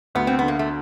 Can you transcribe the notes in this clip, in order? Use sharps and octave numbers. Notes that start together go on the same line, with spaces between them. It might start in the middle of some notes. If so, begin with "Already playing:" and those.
D2 B3
C4
D3 B3
A#3
A3